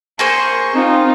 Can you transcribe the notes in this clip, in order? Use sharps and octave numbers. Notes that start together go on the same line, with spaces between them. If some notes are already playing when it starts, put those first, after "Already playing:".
A#3 G#4 C5 C#6
C4 D#4 F4